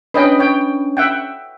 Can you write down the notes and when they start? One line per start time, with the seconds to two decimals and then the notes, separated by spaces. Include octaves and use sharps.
0.14 C#4 D4 B4 D#5 G5
0.39 C#5 G5
0.97 E5 F#5 G5